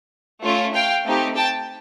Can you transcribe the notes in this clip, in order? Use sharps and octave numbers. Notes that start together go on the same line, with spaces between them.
A3 C#4 F4
F5 G5
A3 C4 D#4 G4
G5 A5